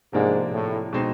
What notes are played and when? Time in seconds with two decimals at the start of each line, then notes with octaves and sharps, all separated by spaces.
0.13 G#2 C3 F3 A#3 D4
0.52 A2
0.93 B2 G#3 C4 D#4